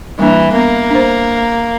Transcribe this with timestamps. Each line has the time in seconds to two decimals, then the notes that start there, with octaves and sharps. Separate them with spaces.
0.19 E3 G3 A#3 D4
0.54 A#3 B3
0.90 D4 C5